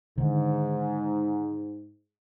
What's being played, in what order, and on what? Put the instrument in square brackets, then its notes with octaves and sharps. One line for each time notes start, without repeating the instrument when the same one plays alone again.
[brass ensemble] G#2 [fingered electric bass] D3 D#3